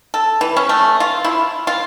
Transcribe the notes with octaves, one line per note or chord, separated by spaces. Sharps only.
A4
E3
C#4
A3
F4
E4
F4